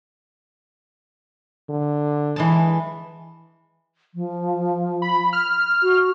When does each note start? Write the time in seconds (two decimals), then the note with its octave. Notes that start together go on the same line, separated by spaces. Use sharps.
1.70 D3
2.36 E3 G#3 A5
4.14 F3
5.02 B5
5.33 F6
5.83 F#4